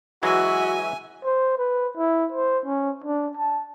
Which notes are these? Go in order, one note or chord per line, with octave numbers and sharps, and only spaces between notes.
E3 F#3 G#3 F#4 E5 G#5
C5
B4
E4
C5
C#4
D4
A5